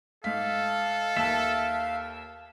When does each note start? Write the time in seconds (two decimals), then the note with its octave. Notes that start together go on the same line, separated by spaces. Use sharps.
0.24 G#2 A4 F5 B6
1.17 D#2 E5 A5